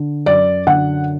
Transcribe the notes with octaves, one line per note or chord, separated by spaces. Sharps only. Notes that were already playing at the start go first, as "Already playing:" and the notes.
Already playing: D3
F#2 D5
D3 F#5